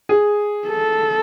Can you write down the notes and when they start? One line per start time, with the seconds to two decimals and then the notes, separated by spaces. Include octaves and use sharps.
0.09 G#4
0.67 A4